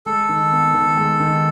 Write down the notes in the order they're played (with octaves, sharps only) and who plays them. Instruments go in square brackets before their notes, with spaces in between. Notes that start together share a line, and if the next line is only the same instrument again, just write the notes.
[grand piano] G#3 [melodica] A4
[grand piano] D#3
B3
D#3
G#3
D#3